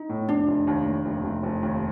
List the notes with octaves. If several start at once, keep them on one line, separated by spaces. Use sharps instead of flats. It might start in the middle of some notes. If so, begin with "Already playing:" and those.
Already playing: D#4
A2
F1 D4
F1
D#2
D#2
F1
F1
F1
D#2